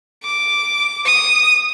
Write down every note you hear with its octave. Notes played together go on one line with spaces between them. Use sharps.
D6
D#6